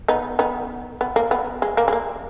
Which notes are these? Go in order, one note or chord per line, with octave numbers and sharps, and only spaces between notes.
B3 D#4
B3 D#4
B3
A#3
B3
G#3
A#3
G#3
A#3